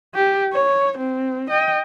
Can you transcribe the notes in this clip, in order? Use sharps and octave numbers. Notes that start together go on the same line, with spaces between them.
G4
C#5
C4
D#5 G5